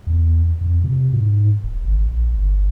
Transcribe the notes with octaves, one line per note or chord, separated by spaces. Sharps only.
E2
F2
C3
G#2
E1
G#1
A#1
G1